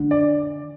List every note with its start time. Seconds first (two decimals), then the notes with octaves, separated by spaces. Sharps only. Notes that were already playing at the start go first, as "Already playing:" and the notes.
Already playing: D3
0.11 D5